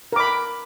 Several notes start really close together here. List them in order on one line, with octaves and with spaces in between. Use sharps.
A#4 D6 B5